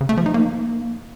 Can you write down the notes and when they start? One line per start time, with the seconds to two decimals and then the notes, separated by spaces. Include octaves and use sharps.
0.01 C#3
0.09 A3
0.17 F3
0.26 D#4
0.34 A#3